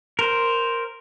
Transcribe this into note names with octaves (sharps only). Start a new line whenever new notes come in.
A#4 C5